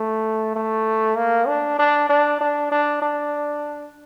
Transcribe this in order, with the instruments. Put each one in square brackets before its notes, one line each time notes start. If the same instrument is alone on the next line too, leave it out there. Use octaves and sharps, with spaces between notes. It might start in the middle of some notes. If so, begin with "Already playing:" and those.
Already playing: [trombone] A3
A3
A#3
D4
D4
D4
D4
D4
D4